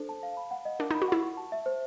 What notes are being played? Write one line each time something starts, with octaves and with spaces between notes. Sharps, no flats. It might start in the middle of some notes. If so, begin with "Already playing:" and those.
Already playing: D4 A4 C5
A5
F5
B5
F#5
D#5
D4 A#4
D#4 B5
F#4
E4 F#5
C#6
A5
E5
C5